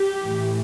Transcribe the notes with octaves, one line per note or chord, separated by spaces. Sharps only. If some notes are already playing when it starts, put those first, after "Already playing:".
Already playing: G4
A2 E3